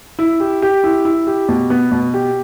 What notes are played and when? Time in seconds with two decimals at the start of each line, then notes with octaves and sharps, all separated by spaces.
0.19 E4
0.40 G4
0.62 G4
0.84 E4
1.05 E4
1.27 G4
1.49 B2
1.70 B3
1.92 B2
2.14 G4